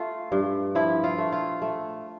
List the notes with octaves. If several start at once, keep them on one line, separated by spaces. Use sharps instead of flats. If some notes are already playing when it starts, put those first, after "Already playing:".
Already playing: A3 F4
G2
F3 E4
F4
A3
F4
A3